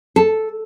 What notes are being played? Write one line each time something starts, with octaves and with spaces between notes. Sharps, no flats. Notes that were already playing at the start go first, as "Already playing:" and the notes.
A4